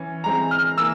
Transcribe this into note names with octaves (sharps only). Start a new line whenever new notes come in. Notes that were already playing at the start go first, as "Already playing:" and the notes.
Already playing: E3 C#4
E3 G#3 C4 A#5
F6
E3 A#3 E6